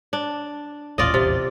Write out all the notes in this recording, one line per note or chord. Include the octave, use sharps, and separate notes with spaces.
D4
D#1 A1 E2 F4 D5 D#5
C3